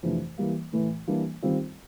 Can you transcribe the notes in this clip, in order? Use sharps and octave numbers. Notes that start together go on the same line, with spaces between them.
F2 C3 E3 A3 D4
E3 G3 A#3
A2 E3 A3
E3 G3 A#3 D4
D#3 G3 C4 F4